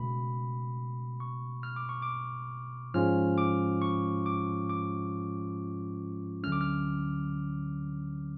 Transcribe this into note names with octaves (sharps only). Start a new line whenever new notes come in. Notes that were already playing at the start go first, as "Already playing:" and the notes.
Already playing: C#2 B2 A3 B5
C#6
F6
D6
C#6
D6
G#2 F3 G#3 C#4 F4 F6
D6
C#6
D6
D6
D2 D3 F#3 A3 C#4 F6
D6
F6